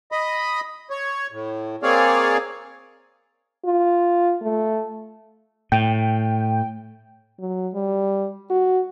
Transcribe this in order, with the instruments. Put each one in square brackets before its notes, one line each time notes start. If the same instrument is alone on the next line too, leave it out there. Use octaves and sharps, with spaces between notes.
[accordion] D#5 B5
C#5
A2
A#3 C4 G#4 C#5 D5 F5
[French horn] F4
A3
[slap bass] A2 [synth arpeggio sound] G5
[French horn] F#3
G3
F#4